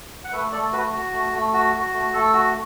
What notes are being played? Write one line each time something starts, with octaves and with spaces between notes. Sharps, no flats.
F#5
A3 B4 E5
A3 A4 D5
F#4 B4
F#4
A3
A3
F#4
F#4
A3
A3 A4
F#4